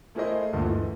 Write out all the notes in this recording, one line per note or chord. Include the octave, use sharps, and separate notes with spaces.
A3 E4 G#4 A#4 C5 D#5
D2 G2 A#2 A3
E3